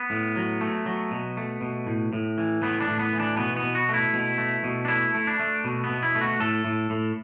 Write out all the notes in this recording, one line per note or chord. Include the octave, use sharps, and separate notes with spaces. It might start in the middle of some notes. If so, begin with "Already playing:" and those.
Already playing: B3
A2
F#3
A3
F#3
B2
A3
B2
A2
A2
E3
A2 B3
D4
A2
B3
E3
D4
B2 B3
B3
B2
F#4
A3
E4
B2
A3
B2
D4
A3 E4
A3
D4
A3
B2
B3
B2
E4
A3
F#4
A2 A4
A2
A2